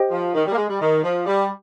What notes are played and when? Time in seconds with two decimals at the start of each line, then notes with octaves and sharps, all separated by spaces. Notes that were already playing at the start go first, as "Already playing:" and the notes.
Already playing: G4 C5 D#5 G5
0.10 F3
0.34 D#3
0.46 G3
0.52 A#3
0.56 G#3
0.68 G3
0.80 D#3
1.02 F3
1.26 G3